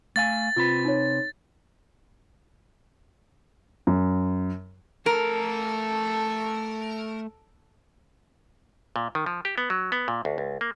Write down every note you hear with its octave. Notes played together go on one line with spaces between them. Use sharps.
A3 F5 G#5 A6
C3 C4 F4 B4
D#4 C#5
F#2
A3 A4 A#4 A#5
A#2
D#3
F3
G4
B3
F#3
B3
A#2
D2
C#2
A#3